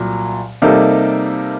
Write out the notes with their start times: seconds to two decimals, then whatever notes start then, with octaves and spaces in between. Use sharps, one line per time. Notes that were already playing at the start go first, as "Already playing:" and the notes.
Already playing: C2 A#2 F#3
0.62 C3 G3 A#3 D#4 A4